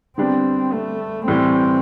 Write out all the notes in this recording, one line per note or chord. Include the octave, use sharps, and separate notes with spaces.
D3 G3 B3 C4 D4 G4
A3
A2 E3 G3 C4